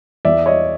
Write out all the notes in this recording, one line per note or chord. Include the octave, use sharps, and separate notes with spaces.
E2 D5 E5
C#5 D#5